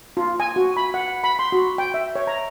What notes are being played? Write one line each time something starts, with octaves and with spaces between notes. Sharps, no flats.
F4
G#5
F#4
B5
F#5
B5
C6
F#4
G5
E5
C#5
A#5